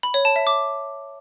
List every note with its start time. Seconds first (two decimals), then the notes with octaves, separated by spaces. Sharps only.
0.03 B5
0.14 C#5
0.25 A5
0.36 E5
0.47 D6